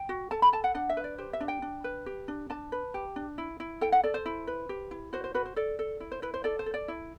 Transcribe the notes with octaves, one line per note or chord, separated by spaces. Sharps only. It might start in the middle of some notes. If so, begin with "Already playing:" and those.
Already playing: G5
F#4
A4 A5
B5
A4 A5
F#5
D4 F#5
E5
B4
D5
G4 C5
E5
D4
G5
D4
B4
G4
D4
D4 A5
B4
G4
D4
E4
E4
A4 G5
F#5
A4 D5
C5
E4
B4
G4
E4
F#4 C5
C5
F#4 B4
C5
A4 D5
A4
E4
C5
E4 B4
C5
A4 D5
C5
A4
D5
E4